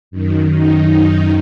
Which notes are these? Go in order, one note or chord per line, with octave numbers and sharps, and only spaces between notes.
F#2 D#3
D#4
D#4